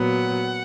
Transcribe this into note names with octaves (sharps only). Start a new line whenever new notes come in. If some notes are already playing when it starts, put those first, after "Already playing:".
Already playing: A#2 F#3 B3 F#5